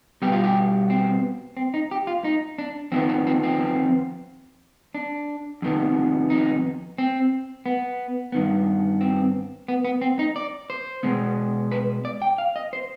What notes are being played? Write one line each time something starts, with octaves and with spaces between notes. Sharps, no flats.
B2 G3 B3 G4
F4
G4
C4
C4
D#4
G4
F4
D#4
D4
F2 D#3 B3 C4
C4
C4
C4
D4
F2 C3 D#3 B3
D#4
C4
B3
G2 D#3 B3
C4
B3
B3
C4
D#4
D5
C5
B2 G#3 B3
B4
D5
G5
F5
D#5
C5